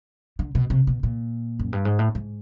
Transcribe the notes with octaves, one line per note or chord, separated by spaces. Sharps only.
D3
B2
C3
B2
A#2
F#2
G2
G#2
A2
G#2